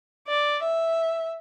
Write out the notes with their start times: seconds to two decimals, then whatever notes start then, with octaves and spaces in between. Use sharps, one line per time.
0.28 D5
0.63 E5